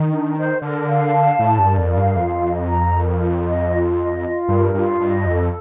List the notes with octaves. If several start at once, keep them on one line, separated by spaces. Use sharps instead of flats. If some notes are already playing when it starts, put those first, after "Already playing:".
Already playing: D#3
D4
C5
D3 A#4
F5
A5
A2 D5
G2
A#4
F2
F5
G2
F2 F4
D#5
A#5
A#4
F4
D#5
F4
D#5
F4
G2 A#4
G2 F4
G2 D#5
F2 A4